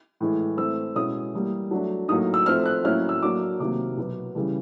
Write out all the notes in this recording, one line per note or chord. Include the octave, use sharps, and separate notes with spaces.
A2 E3 G#3
E3 A3 C4 E6
B2 G#3 C#4 E4 D#6
E3 G3 A#3
F#3 A3 D4
A2 F#3 A#3 D#4 D#6
E6
F3 A3 C4 F6
F#6
A2 F#3 A#3 C#4 E4 F6
E6
F#3 A#3 D4 D6
C3 D#3 F#3 A#3 D6
B2 F#3 B3
C#3 E3 G3